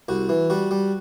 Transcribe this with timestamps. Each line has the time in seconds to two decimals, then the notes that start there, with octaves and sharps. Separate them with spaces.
0.08 C2 F#4
0.29 E3
0.50 G3 F#4
0.71 G3